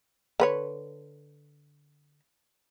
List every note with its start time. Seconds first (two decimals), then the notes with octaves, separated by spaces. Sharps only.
0.40 D3 B4 C#5